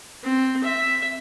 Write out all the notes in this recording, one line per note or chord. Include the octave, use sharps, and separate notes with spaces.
C4
E5